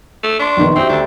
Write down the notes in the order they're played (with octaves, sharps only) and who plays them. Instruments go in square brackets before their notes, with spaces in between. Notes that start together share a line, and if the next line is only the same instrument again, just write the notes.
[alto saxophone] A3
[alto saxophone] D4 [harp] C6 C#6
[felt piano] A#1 D#3 B3
[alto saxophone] C4 [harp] C#4 F#4 G4 [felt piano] C5 E5 G5
[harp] D2 A4 [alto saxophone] D4